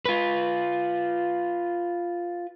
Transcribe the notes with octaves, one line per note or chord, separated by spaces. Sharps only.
F4 B4